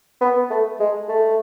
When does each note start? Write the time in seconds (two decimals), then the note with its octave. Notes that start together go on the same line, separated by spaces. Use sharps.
0.21 B3
0.50 A3
0.80 G#3
1.09 A3